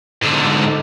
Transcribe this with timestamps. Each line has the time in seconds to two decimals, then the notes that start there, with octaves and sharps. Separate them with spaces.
0.22 G#2 D3